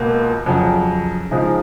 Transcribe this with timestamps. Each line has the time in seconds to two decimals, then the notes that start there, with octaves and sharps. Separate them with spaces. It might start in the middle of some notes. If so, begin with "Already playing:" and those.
Already playing: C#2 B2 A#3
0.46 F2 C#3 F#3
1.31 C#3 F3 G#3 D#4